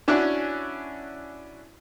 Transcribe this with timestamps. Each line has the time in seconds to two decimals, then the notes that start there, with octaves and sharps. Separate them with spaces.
0.08 C#4 D4 E4 F#4